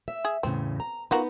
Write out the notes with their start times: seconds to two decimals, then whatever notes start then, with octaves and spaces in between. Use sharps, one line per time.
0.08 E5
0.25 G#4
0.43 E2 A2 C#3 C4
0.80 A#5
1.11 B3 D#4 F4 F#4 A#4